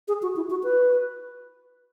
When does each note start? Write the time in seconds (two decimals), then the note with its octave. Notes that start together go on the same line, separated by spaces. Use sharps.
0.08 G#4
0.22 F#4
0.36 E4
0.50 F#4
0.63 B4